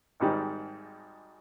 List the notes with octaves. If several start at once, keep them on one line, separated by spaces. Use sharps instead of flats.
G#1 G#2 D#3 G3